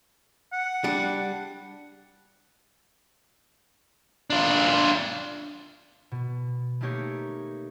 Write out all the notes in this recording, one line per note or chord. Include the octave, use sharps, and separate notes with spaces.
F#5
G3 D4
D4 F4
B2
A3 A#3 D#4 G4 C#5